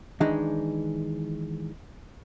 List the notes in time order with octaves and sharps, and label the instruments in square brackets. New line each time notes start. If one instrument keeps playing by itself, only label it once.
[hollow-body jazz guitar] D#3 E3 G#3 D4 D#4